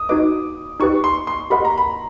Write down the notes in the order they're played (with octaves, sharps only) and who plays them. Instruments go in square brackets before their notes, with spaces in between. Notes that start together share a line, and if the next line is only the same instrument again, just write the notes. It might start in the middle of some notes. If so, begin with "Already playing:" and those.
Already playing: [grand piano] D#6
[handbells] D#4 F#4 B4 D#5 [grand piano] D6
[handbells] D#4 G4 B4 [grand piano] C#6
[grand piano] C6
C6
[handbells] G4 A#4 D#5 F#5 [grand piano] B5
[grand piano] A#5
B5